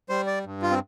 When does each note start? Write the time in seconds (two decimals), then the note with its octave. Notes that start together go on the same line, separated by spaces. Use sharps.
0.09 G3 C5
0.27 D5
0.45 G2
0.62 F4
0.71 C4